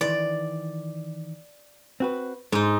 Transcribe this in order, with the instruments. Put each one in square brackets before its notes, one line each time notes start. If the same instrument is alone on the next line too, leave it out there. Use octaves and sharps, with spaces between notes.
[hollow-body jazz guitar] D#3 E3 [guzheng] D5
[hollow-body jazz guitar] C4 F#4 B4
[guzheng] G#2 D#4 [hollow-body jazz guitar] G#3